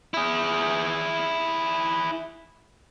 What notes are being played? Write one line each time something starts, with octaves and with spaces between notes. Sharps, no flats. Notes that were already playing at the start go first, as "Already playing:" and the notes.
E4 G#4